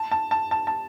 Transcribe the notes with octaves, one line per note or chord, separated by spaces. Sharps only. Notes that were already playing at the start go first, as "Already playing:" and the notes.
Already playing: A5
A5
A5
A5
A5